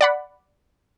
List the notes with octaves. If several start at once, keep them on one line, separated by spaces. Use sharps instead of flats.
D5 F#5 B5